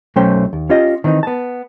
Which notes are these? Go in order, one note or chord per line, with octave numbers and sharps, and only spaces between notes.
B1 F#3 A3 C#4 C5 G5
D#2
C#4 F4 G4 D#5
D#3 E3 C4 C#4 D#4
B3 A5